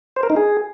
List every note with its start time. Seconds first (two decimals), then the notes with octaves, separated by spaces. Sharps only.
0.16 C5
0.23 A#4
0.30 D#4
0.36 G#4